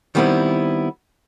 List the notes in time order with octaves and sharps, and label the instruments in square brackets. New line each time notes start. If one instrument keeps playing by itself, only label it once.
[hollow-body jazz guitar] D#3 G3 B3 C4 E4